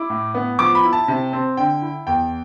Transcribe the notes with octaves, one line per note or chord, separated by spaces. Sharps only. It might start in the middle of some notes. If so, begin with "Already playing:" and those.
Already playing: E4 D6
A2
B3
F3 D6
B5
E4
A5
C3
C4
D3 G5
E4
E2 G5